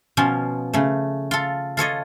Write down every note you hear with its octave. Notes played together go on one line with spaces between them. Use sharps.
B2 F3 C#4 F4
C#3 A3
F4 A4
F4 A4 C#5 D#5